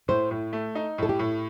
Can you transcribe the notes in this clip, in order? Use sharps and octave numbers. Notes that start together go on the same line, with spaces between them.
A2 C5
A2
A3
D#4
A2 A4
G4
A2